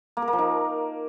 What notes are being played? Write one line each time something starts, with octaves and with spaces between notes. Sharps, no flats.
A#3
A#4
A#3
F3
D#4